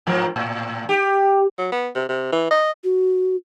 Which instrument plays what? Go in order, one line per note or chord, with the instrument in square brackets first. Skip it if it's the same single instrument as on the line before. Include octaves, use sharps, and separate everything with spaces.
[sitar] G#2 F3 A#4
A2
G4
[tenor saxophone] F#3
B3
C3
C3
E3
D#5
[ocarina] F#4